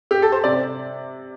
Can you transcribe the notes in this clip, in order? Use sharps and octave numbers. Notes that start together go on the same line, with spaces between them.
G4
A4
C5
C3 D5